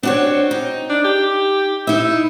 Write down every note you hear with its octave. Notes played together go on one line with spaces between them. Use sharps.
C4 D4 F#4 C#5
D#4
D4
G4
D#4 E4 E5